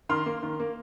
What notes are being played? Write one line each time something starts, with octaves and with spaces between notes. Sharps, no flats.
D#3 C6 F6
A#3
D#3
A#3